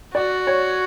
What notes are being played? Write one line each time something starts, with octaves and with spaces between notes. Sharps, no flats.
F#4 D5
C#5